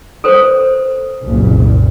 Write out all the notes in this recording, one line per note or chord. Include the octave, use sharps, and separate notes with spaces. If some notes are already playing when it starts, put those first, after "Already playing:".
A4 B4 C5
F#1 C2 A#2